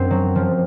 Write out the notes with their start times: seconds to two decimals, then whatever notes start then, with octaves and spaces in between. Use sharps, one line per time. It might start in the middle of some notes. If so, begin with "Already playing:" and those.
Already playing: F#2 C4
0.11 F#3
0.35 F3